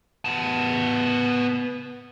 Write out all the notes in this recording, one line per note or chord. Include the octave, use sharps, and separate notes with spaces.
B3 A5